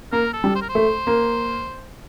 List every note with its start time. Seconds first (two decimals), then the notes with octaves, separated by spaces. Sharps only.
0.12 A#3 A#4
0.33 A4
0.44 G3
0.55 C5
0.62 A#4
0.69 C5
0.75 A3
1.07 A#3